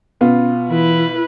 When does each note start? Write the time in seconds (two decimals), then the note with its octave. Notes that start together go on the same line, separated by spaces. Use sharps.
0.21 B2 B3 C#4 F4
0.68 E3 E4 B4